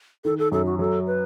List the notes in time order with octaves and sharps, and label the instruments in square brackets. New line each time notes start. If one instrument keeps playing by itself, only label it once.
[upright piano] D#3 [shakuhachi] A4
[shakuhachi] A4
[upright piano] F#2 [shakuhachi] A4
[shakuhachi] F#4
[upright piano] F#3 [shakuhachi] A4
[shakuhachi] B4